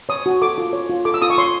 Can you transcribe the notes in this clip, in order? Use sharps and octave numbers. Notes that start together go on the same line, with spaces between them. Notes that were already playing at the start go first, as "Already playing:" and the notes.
C#5 D#6
F#4
A4 D6
F4
C#5
F4
A4 D6
E6
F4 D#6
C#6
C#5 C6